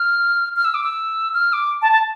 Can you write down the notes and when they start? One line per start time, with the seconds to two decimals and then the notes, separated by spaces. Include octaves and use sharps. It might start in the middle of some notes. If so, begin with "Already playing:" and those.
Already playing: F6
0.56 F6
0.65 E6
0.74 D6
0.84 E6
1.34 F6
1.53 D6
1.82 A5
1.92 A5